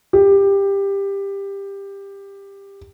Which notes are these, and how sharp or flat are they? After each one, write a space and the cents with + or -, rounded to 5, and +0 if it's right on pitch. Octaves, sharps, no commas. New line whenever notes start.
G4 +15